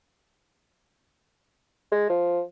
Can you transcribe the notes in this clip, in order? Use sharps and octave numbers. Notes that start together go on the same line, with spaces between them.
G#3
F3